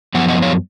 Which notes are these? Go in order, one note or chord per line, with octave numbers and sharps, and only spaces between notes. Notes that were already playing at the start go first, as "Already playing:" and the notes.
F#2 F3 B3 F#5
D#5 F#5
C#5 F5